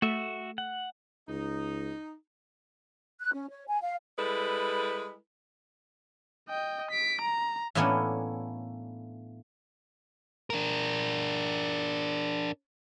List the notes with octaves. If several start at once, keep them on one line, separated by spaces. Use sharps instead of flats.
A3 F#4 E5
F#5
C#2 D#4
F#6
C#4
C#5
G#5
F5
G3 G#3 E4 A4 B4
D#5 G5
B6 D7
A#5
A2 E3 A#3 B3 C#4 D4
D4 A#4